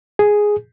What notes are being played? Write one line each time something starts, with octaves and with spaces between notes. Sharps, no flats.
G#4